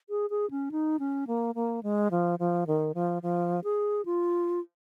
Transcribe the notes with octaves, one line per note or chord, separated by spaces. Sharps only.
G#4
G#4
C#4
D#4
C#4
A#3
A#3
G#3
F3
F3
D#3
F3
F3
G#4
F4